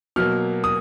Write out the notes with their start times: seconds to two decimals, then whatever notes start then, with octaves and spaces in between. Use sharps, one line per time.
0.16 B2 F#3 A#3 F6
0.64 D#6